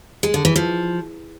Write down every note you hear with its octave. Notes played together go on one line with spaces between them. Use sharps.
G#3
D3
E3
F3